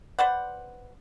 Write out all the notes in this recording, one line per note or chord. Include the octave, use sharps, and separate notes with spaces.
B4 C5 D5 F#5